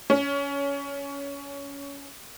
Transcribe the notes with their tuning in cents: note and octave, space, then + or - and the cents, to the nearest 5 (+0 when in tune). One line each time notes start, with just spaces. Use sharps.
C#4 +20